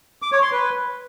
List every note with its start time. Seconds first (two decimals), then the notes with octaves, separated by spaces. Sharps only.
0.22 D6
0.32 C#5
0.42 C6
0.52 B4